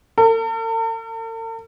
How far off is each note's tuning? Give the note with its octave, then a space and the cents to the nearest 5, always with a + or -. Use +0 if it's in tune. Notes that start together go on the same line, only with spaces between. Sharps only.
A4 +45